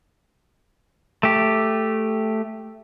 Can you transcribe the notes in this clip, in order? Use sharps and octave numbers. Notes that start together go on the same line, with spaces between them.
A3 G4